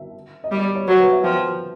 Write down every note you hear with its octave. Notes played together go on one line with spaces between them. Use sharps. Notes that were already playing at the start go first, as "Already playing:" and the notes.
Already playing: E5
D#5
G3 D5
D5
C#5
F#3 C5
B4
E5
F3 G5